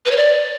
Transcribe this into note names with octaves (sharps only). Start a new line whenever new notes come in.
B4
C#5
D5